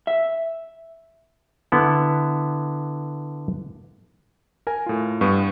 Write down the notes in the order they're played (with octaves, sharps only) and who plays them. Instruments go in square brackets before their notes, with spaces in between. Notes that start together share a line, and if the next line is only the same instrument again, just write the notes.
[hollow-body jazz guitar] E5
[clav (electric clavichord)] D3 B3 E4
[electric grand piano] A#4 G#5
A2 F4
G2 B3 C#6